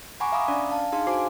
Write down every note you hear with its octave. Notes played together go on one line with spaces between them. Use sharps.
F#5 G#5 A#5 B5 C#6 D6
E5 F5 A#5 B5 D6 D#6
C#4 D4 D5
F5 A5
D4 D#4 G#4 F5 A5 C6
F#4 C5 G#5 D6 C7